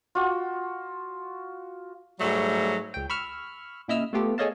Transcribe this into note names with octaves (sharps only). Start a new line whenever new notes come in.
F4 F#4
G#2 F#3 G3 A3
C#2 G5
B5 C#6 E6 F6
A#2 C#3 E4 D#5 E6 F6
A3 B3 F4 G4 A4
G#4 A4 C#5 D#5 F5 A5